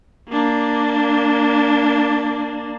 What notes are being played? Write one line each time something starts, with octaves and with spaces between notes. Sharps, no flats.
A#3 D4